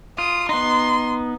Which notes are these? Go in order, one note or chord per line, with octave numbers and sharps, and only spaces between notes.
F4 D#6
B3 D#4 C6